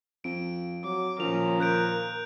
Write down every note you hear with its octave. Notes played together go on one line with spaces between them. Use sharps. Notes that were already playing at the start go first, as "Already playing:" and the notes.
F2 D7
F#3 D6
A#2 D#3 F3 C#4 F7
A#4 F#6 G6 D7